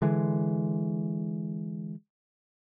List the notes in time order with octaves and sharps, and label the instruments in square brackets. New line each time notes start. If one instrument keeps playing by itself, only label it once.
[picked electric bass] D3 E3 G#3